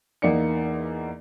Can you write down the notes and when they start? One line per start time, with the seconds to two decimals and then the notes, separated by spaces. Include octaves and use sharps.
0.22 E2 A#3 D#4 D5 C#7